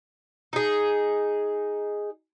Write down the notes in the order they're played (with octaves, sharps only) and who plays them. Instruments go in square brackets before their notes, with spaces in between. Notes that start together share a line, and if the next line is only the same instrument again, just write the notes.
[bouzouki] D#4 G#4